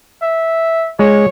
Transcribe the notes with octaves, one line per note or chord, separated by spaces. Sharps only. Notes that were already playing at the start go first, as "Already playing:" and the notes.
E5
G#3 C#5